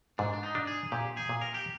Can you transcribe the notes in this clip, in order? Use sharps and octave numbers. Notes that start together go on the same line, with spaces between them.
G#2 D4
D4
D#4
D4
G#4
A#2 G4
G#4
A#2
A#4
G4